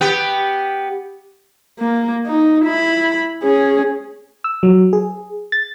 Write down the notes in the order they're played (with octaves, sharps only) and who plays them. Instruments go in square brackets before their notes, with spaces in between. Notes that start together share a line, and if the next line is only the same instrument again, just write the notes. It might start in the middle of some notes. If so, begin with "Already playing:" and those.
[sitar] B3 G4
[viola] A#3
D#4
E4 B5
C#4 G#4
[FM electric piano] E6
F#3
G#4
A6